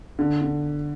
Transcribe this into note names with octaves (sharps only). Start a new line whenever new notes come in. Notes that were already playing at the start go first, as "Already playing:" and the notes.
D3
D3